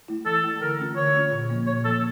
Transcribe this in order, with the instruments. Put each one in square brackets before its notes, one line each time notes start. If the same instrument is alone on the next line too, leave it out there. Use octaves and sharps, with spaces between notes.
[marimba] A3 E4
[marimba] E3 [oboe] A4
[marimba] A3 E4
[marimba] D3 [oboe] A#4
[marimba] A3 C#4 F4
[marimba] D3 [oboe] C#5
[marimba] A3 C#4 F4
A#2
F3 A#3
[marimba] A#2 [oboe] C#5
[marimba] F3 A#3 [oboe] A4